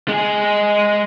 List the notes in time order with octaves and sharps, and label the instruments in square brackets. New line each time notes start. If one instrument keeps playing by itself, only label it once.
[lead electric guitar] G#3 G#4